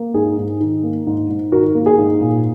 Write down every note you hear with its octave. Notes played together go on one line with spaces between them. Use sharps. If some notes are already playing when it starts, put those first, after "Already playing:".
Already playing: A#3
G#2 G#4
G#2
D#3
A#3
G#2
G#2
D#3 F#4 A#4
A#3
G#4
G#2
A#2